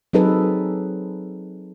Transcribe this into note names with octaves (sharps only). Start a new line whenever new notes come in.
F#3 C4 D#4 G#4 A4 B4